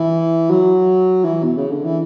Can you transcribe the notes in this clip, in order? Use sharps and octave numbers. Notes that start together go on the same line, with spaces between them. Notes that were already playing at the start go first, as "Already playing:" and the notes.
Already playing: E3
F#3
E3
B2
C#3
D3
E3